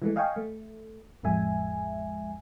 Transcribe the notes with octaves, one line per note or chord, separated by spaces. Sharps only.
E3 G#3 A3
D#5 F5 G5 G#5 C#6
A3
A1 F2 G#3 E5 G#5